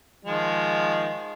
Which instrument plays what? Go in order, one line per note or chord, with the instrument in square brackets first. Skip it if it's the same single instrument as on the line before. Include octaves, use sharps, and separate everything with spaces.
[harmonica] D#3 F3 G#3